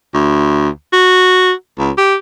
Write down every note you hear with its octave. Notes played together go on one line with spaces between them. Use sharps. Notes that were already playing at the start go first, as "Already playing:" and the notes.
D2
F#4
C#2
G4